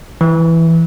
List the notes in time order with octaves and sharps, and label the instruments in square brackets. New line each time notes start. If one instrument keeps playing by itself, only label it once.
[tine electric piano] E3